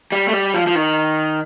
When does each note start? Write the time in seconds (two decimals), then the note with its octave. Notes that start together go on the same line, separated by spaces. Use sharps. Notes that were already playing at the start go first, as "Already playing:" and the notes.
0.12 G3
0.28 A3
0.33 G3
0.54 F3
0.67 F3
0.75 D#3